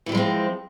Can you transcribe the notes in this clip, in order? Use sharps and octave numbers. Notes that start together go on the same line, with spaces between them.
E3 F3 G3 G#3 C4